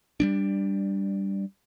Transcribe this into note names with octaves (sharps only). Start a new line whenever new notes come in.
G3 G#3 D4